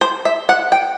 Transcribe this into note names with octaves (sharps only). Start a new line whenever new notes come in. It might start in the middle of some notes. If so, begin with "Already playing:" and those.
C5
E5
F#5
G5